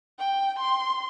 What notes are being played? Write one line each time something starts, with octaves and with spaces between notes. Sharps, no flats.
G5
C6